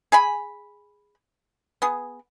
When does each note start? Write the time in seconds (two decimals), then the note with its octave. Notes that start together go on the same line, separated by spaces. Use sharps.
0.12 G#4 G#5 B5
1.82 B3 G#4